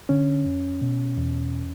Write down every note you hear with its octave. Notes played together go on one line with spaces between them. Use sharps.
D3 C#4
F2
B2
E2